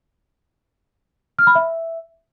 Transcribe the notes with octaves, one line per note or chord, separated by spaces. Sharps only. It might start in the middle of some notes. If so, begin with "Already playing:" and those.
F6
B5
E5